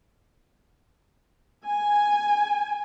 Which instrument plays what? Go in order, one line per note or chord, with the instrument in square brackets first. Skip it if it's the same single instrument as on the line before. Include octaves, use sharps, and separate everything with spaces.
[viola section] G#5